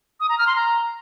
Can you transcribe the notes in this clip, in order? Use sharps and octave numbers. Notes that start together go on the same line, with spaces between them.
D#6
A#5
F6
C6
A#5